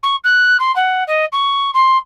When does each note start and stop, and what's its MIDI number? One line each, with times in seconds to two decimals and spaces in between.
0.03 0.16 85
0.24 0.57 90
0.59 0.74 84
0.75 1.03 78
1.07 1.25 75
1.32 1.71 85
1.74 1.97 84